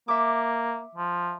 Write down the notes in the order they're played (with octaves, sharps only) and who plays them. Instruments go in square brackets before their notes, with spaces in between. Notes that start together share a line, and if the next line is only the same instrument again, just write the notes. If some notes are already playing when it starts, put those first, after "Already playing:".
[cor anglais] A#3 [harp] E5 D6
[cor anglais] F3